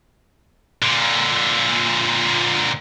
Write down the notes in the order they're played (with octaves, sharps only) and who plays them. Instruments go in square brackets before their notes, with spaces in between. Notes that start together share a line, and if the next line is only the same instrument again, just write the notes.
[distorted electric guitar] A#2 D3